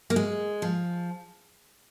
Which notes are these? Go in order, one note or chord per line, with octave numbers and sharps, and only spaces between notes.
A#3
G#3
F3